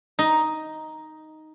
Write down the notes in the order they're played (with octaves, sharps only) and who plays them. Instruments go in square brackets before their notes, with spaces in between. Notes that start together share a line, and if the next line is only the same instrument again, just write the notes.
[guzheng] D#4